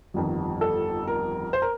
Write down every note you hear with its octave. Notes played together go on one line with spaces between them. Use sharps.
G1 F2 D#3
A4
A#4
C5
A#4